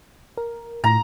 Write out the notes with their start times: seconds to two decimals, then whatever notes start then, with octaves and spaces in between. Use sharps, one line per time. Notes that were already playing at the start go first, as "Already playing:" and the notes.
0.37 A#4
0.84 A2 A#5